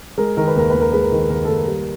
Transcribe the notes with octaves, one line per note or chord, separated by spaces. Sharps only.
G#3 A#4
D#3 A#4
B4
D#2 A#4
D#2 B4
A#4
G#3 B4
A#4
D#3
D#2 A#4
D#2 A4
A#4
G3